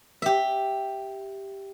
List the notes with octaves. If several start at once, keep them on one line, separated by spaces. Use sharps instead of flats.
G4 E5